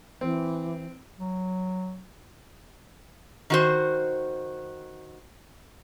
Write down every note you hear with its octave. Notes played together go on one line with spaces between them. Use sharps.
E3 C4
F#3
D#3 F#4 C5